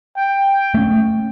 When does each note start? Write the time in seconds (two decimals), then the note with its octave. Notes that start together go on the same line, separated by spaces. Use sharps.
0.17 G5
0.74 A3 C#4